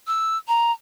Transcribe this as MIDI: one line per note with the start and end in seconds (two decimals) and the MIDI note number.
0.07 0.38 88
0.48 0.72 82